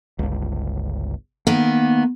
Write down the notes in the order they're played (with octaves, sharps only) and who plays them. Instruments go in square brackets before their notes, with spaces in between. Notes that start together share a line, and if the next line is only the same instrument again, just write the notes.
[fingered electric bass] G1 C#2
[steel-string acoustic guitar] D#3 B3 [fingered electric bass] A#3